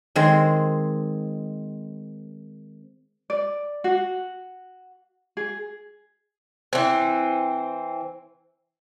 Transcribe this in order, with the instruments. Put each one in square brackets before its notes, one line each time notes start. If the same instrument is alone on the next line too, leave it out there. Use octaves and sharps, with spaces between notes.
[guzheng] D#3 G#3 C4
[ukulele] D5
F#4
G#4
[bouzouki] E3 C4